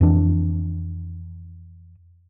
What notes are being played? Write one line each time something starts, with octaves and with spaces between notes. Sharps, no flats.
F2 E3 D4